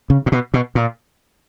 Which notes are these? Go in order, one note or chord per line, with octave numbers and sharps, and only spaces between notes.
C#3
A#2
B2
B2
A#2